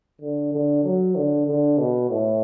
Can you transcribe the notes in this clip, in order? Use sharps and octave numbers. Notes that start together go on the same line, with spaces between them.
D3
D3
F#3
D3
D3
B2
A2